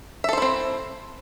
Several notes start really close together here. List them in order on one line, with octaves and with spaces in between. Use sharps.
E5 A4 C5 E4 C4